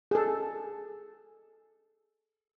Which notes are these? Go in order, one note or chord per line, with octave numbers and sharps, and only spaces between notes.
G#4 A4